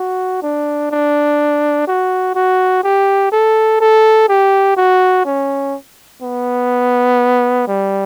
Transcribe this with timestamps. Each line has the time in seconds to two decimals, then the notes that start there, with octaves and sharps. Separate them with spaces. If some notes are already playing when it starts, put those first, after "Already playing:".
Already playing: F#4
0.42 D4
0.91 D4
1.88 F#4
2.35 F#4
2.84 G4
3.32 A4
3.80 A4
4.29 G4
4.77 F#4
5.25 C#4
6.22 B3
7.68 G3